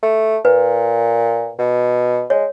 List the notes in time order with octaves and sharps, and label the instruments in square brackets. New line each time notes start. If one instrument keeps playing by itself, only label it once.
[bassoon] A3
[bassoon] A#2 [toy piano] B4
[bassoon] B2
[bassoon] G#3 [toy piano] C#5